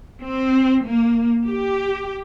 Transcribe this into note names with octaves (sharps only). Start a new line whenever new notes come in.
C4
A#3
G4